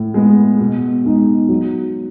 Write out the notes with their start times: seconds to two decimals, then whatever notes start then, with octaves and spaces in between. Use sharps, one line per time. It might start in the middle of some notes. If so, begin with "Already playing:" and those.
Already playing: A2
0.14 G#3 B3
0.60 B2
1.05 G#3 D#4
1.49 F#3